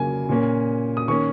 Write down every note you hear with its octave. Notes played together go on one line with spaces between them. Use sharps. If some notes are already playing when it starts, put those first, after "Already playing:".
Already playing: C#3 F#3 A#3 G#5
A#2 A#3 C#4
D#6
D#3 A#3 C#4 C#6